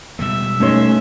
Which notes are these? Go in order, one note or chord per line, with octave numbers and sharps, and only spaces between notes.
B2 G3 G#3 E5
A3 C#4 D#4 A4 C#5 C6